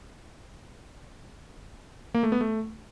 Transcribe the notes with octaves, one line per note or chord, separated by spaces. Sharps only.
A#3
A3
B3
A3